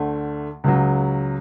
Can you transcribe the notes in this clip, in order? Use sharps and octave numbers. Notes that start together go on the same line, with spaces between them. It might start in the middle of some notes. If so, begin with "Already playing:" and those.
Already playing: D2 D3 A3
C#2 C#3 F#3